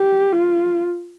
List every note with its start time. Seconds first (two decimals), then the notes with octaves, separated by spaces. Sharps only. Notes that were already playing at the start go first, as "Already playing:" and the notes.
Already playing: G4
0.33 F4